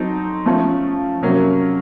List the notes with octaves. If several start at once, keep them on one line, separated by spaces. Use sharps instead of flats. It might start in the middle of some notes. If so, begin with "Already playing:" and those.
Already playing: F#3 C4 D#4 A4
F3 A3 C#4
C3 F#3 A#3 C#4